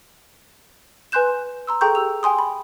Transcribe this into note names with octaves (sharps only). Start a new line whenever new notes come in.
B4 G#5 C6 F#6 G6 E7
A#5 C6 E6
G#4 A4 G5 A#5 C#6 G6
G4 E6 F7
G5 G#5 C6 D#6
B5